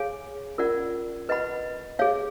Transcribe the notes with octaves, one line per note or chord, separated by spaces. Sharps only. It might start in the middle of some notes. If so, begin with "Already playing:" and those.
Already playing: G#4 C#5 F5 G#5
C#4 F4 A#4 D5 F#5
B4 D#5 F#5 B5
G#4 C#5 F5